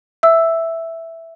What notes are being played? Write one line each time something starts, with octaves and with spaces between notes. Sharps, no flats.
E5 E6